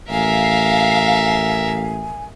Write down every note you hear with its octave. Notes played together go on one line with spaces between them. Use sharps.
A1 A#4 E5 F5 G#5